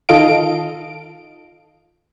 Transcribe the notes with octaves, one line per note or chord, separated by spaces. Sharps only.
D#3 F4 A4 D#5 F5 D7